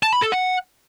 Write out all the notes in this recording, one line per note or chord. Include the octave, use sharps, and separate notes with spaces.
A5
B5
A4
F#5